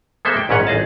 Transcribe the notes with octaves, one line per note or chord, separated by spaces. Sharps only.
G#3 A#3 B3 A4 C5 E5
G5
A#1 G#2 C#4 B4 C#5 F#5
A1 G#4 D#5 A5